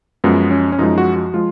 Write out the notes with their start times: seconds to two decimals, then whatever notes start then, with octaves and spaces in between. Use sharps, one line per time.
0.24 F#2 F3 G#3 B3
0.51 C#4
0.72 C#4
0.79 F#2 F3 G#3 D#4
0.98 F#4
1.16 F#4
1.34 F3 G#3 F4